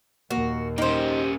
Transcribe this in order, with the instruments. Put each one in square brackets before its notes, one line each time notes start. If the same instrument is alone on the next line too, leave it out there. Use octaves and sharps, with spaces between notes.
[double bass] D#2 A#2 [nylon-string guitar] A#3 [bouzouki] F#4
[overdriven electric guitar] A#3 C#4 [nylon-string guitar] D#4 [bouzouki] G4 C5